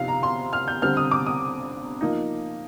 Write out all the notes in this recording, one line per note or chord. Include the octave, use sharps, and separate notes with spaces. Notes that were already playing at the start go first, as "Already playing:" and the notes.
Already playing: C3 F3 C4 D#4 F5
A#5
C6
F6
G6
D3 G3 C4 F6
D#6
D6
D#6
F3 A#3 D#4